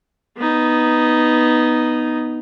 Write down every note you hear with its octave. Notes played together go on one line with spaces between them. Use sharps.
B3 D#4